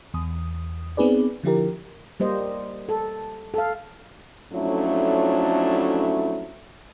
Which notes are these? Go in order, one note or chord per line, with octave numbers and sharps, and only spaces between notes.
E2 D#6
B3 C4 D#4 G#4 B4 D5
D3 F3 E4 G4 A#4
G3 A#3 C5 D#5
A4
A4 F5
F2 F#3 A3 C#4 D4 E4